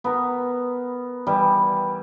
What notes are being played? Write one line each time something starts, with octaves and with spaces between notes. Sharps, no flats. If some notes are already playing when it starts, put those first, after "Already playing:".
B3 A#4
E3 G3